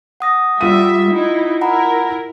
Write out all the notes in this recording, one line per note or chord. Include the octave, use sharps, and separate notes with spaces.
F#5 D#6 A#6
G3 F4 E5 D#7
D#4 E4
E4 A#4 F#5 A#5 B5